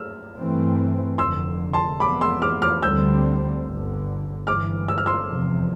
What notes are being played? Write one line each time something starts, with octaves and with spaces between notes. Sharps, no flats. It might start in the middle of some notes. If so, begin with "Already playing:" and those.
Already playing: E6 F6
G2 E3 A3 C4
F1 F2 D3 C6 E6
A5 C6
F2 E3 B3 B5 D6
C6 E6
D6 F6
D6 F6
D2 D3 G3 C4 E6 G6
G1 G2 D3
G1 G2 E3 D6 F6
E6
F6
C6 E6
F1 E2 C3 F3